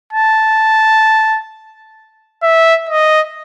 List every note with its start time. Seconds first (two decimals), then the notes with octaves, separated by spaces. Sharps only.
0.13 A5
2.43 E5
2.89 D#5